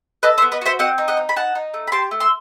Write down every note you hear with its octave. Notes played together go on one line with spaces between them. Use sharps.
A4 B4 D#5
C5 E5
B3
B4 D#5
F#4 C5 E5
C4 D#5 F#5
D#4
D#5 F#5
D#4
B5
D#4 F#5 A5
D#4
A3
B5
G4 A5 C6
A3
C6 E6